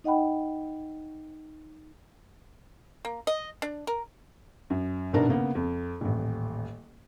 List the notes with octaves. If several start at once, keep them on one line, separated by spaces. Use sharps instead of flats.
D#4 D#5 F#5 G5 B5
A#3
D#5
D4
A#4
F#2
A#1 B2 B3 D4 D#4 A#4
C#3 A#3 B3
F2
D#1 A1